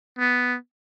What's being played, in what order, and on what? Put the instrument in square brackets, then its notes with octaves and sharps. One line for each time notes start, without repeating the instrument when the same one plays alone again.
[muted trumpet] B3